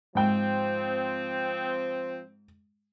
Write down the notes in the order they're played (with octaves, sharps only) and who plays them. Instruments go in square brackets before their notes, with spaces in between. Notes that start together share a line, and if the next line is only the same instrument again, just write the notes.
[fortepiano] G#2 G5 [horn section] F3 C4